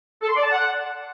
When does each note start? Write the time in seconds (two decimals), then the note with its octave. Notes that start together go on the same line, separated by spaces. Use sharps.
0.22 A4
0.29 C6
0.36 D5
0.44 A5
0.51 F#5